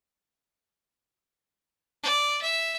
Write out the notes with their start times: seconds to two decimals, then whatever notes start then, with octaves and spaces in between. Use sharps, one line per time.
2.04 D5
2.42 E5